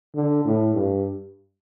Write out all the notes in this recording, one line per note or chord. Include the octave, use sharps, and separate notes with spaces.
D3
A2
G2